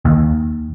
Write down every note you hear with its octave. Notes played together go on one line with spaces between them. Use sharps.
D#2